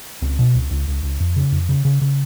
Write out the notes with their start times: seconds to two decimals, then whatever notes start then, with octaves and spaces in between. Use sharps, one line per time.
0.22 C#2 C4
0.39 B2
0.55 C#2
0.71 C#2
0.88 C#2
1.03 C#2
1.20 F2
1.36 C#3
1.52 F2
1.69 C#3
1.85 C#3
2.02 C#3